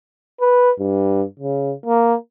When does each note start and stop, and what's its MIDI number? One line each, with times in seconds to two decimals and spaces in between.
0.41 0.71 71
0.79 1.24 43
1.40 1.74 49
1.86 2.15 58